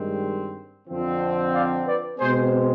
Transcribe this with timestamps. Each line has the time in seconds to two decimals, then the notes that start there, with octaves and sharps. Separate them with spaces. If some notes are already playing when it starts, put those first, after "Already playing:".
Already playing: G2 D#3 G#3 C4
0.88 F2 D3 F3 C4
1.53 D5 F5
1.85 B4 D5
2.18 B2 G#3 C4 G#4 C5